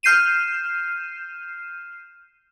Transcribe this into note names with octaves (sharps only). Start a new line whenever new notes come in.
F6 G6 C7 D#7 E7